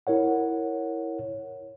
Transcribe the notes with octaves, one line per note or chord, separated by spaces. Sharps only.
E4 A#4 C#5 F#5